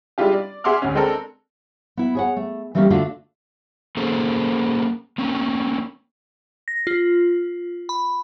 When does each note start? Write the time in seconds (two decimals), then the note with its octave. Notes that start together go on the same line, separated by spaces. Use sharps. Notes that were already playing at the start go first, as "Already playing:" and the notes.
0.18 G3 G#3 D4 E4 F4 G4
0.33 D5
0.64 G#4 E5 F#5 C6 D6 F6
0.82 D2 C#4
0.95 G#3 C4 D4 A4 A#4
1.97 B3 E4
2.15 G#4 C#5 F#5
2.36 A3
2.75 E3 G3 A3 A#3 C#4 G4
2.90 D3 A3 D4 F4 F#4 A4
3.97 A#3 C#4 G#4 A4 C5
5.18 A#3 C4 C#4
6.68 A#6
6.87 F4
7.89 B5